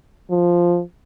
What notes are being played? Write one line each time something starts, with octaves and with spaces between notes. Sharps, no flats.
F3